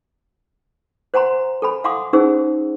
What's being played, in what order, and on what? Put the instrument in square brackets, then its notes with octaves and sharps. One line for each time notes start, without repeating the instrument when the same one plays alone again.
[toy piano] C5 F#5 G#5 A#5 C6
A4 G#5 B5
F5 F#5 G#5 C6 D6 D#6
C#4 D#4 G#4 C5 F#5 E6